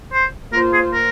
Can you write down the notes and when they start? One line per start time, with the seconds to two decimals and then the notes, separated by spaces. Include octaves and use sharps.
0.13 C5
0.53 A#3 F4 A#4 C5
0.73 G#4
0.93 A#4